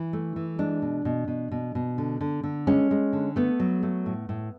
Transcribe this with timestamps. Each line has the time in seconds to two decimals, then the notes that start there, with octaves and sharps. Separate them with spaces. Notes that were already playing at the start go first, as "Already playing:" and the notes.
Already playing: E3 E4
0.13 A3
0.36 E3
0.58 G#3 D4
0.82 B2
1.05 B2
1.28 B2
1.51 B2
1.75 B2
1.98 D3
2.21 D3
2.43 D3
2.67 G#3 C#4
2.91 G#3
3.13 D3
3.36 A3 B3
3.60 F#3
3.83 A3
4.06 A2
4.29 A2